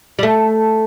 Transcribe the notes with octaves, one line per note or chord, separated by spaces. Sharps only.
G3
A3